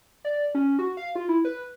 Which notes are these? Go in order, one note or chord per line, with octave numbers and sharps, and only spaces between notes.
D5
C#4
F#4
F5
F4
E4
B4